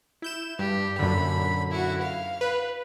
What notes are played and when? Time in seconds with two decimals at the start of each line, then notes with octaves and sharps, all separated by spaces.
0.22 E4 G6 E7
0.59 G2 G4
0.99 F#2 A#2 D3 B5
1.71 E4 F#4
2.02 F5
2.41 B4